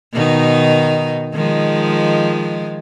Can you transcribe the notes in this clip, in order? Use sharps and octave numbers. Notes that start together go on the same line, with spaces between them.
B2 D#3 D#4
D#3 F3 G#3